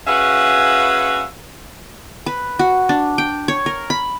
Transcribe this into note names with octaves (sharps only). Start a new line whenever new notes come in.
C#4 F#4 G#4 B4 E5 F5
B4
F#4
D4
G5
C#5
A#4
B5